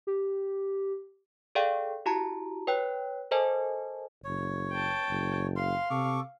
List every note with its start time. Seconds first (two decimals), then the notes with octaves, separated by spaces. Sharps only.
0.07 G4
1.55 G#4 A4 D5 F5 G5
2.06 E4 F#4 G4 A5 A#5
2.67 B4 C#5 G5 F#6
3.31 A4 A#4 C5 D#5 G#5 A5
4.24 F#1 C#5
4.72 G5 A5
5.10 F#1
5.56 F5 C6
5.90 C3 A4 C#6 D6